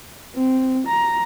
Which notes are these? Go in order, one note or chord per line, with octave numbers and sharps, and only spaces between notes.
C4
A#5